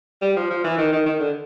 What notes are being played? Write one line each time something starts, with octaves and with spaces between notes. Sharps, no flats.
G3
F3
F3
E3
D#3
D#3
D#3
D3